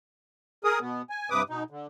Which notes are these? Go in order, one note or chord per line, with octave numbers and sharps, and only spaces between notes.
G#4 A#4 D#6
B2 B3
G#5
G2 C3 B4 D6 D#6
B2 D#4
D3